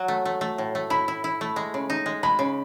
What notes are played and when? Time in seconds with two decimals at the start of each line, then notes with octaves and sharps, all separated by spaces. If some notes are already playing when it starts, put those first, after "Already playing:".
Already playing: F#3
0.08 A3
0.25 A3
0.41 A3
0.58 A2
0.75 A3
0.90 E4 B5
1.08 E4
1.24 E4
1.41 A3
1.56 G#3
1.74 C#3
1.90 D#4
2.06 G#3
2.23 G#3 B5
2.39 C#3